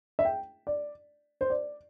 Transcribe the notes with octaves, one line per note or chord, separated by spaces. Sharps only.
E5
G5
D5
C5
D5